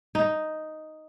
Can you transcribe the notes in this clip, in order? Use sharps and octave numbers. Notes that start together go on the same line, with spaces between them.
D#4